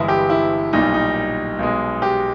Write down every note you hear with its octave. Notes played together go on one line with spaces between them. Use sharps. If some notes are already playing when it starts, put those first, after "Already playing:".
Already playing: G1 G2 E3 G#3 E4
G4
E4
B1 A#2 G3 D#4
D#4
B1 B2 G#3
G4